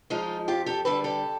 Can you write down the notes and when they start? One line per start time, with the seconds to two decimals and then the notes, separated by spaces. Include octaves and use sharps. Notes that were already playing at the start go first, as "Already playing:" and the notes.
0.10 F3 G#3 D#4 F4
0.48 F2 F4 G4
0.66 G4 A4
0.85 D3 G3 A4 B4
1.04 G4 A4